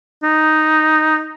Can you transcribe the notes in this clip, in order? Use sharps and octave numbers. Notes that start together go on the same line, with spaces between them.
D#4